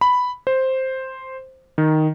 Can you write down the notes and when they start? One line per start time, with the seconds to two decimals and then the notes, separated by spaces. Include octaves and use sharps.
0.01 B5
0.47 C5
1.78 D#3